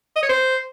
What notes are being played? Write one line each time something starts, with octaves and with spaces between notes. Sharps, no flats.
D#5
C#5
C5